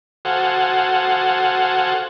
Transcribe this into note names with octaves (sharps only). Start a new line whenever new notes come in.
F#4 A4 C5 F5 F#5 G#5